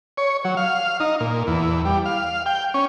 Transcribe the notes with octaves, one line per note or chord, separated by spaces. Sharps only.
C#5
F#3
F5
D#4
A#2
E2
G3
F5
G5
C#4